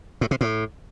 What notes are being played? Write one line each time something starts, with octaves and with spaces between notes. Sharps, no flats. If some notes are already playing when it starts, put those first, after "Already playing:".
A2
C3
A2